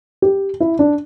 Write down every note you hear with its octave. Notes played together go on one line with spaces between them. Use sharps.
G4
E4
D4